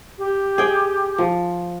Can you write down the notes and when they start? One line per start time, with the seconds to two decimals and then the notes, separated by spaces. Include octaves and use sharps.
0.18 G4
0.58 G#4 G5
1.18 F3